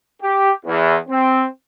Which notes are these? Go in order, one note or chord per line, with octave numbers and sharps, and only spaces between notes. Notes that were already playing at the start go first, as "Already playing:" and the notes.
G4
E2
C4